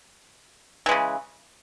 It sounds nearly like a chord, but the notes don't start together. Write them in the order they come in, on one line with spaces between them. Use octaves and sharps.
E3 G#3 C#3